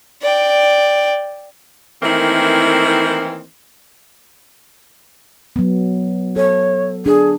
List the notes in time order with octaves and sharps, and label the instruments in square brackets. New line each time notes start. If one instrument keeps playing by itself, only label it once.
[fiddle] D5 G5
[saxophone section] D#3 E3 A3 A#3 C4 E4
[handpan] F#3 B3
[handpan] A4 [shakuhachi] C#5
[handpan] D4 [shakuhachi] G#4